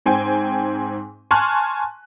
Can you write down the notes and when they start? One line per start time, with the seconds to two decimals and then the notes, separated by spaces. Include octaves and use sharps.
0.06 G#2 C4 G5 G#5
1.31 G#5 A5 C6 C#6 F6 F#6